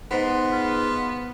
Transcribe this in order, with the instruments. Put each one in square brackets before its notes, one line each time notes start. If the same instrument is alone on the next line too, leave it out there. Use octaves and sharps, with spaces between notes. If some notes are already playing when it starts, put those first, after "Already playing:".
[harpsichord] G#2 [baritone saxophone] B3 [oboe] C6
[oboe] F4